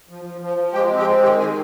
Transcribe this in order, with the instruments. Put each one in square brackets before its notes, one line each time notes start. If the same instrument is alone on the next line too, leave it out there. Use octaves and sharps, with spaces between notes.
[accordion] F3
F3
F3
F3
G#3 G4 G5
C4
G4 G5
G#3
D#3 G4 G5
D#3 G#4 G#5